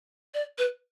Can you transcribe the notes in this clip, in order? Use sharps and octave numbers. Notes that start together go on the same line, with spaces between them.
D5
B4